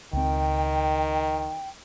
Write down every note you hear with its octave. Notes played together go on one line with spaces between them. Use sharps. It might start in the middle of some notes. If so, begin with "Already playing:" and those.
C#2 D#3 C4 G5